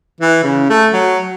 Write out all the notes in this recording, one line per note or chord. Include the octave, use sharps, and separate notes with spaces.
E3
C#3
A3
F#3